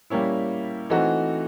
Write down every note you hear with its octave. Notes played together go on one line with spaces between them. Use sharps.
G3 A#3 C#4 E4
E3 A3 C4 D#4 F#4